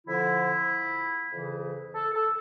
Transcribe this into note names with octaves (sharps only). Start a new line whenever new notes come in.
F2 D3 F3 E4
F2 C#3 E3
A4
A4